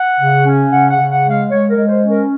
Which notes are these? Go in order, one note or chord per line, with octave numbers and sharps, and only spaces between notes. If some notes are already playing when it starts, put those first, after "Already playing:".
Already playing: F#5
C#3
C#4
C#3 F#5
F#5
C#3
F#5
G#3
F5
G#3 C#5
A#4
G#3
C5
C#4
A#4